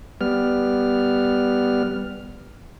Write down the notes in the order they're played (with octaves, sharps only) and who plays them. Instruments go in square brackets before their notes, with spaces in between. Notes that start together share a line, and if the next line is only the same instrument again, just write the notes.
[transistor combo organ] G3 B3 F6